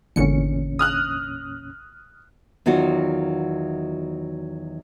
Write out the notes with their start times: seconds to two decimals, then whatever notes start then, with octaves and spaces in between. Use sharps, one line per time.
0.16 G#1 E2 A#2 D3 C#4 C#7
0.79 D#6 F6 F#6
2.66 E2 D#3 F#3 F4 F#4 F#5